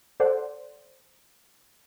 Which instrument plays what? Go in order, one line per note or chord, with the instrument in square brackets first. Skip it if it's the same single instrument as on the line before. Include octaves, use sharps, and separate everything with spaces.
[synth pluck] A4 C5 D5 F#5